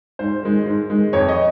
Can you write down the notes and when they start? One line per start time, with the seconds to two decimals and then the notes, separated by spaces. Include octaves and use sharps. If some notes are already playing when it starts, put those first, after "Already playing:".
0.19 G#2 C5
0.43 D#3 G#3
0.66 G#2
0.90 D#3 G#3
1.13 F2 C#5
1.29 D#5